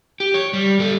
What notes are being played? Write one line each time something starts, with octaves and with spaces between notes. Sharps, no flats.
G4
C#5
G3
G3 A4